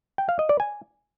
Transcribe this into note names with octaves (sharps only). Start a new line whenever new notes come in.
G5
F5
D#5
D5
G#5